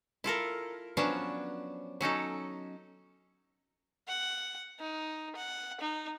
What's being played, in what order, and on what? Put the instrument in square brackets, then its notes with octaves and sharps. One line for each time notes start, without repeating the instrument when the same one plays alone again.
[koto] E4 F4 A4 A#4
F3 F#3 B3 C#4 D4
F#3 C#4 D#4 A4
[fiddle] F#5
D#4
F#5
D#4